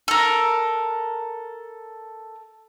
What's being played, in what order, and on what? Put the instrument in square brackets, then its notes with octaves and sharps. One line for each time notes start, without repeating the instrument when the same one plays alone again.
[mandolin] A4 A#4